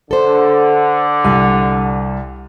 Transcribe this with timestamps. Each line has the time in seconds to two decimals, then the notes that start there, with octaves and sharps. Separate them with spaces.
0.11 D3 A4 C5
1.24 C2 G#5